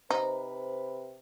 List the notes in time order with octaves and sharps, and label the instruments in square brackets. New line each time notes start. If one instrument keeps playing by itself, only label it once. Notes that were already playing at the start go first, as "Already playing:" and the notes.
[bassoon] C3 [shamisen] D#4 [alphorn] B4 [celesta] C5